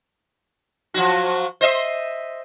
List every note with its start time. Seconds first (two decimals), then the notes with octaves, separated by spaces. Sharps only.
0.94 F3 F#3 F#4
1.61 C5 D#5 E5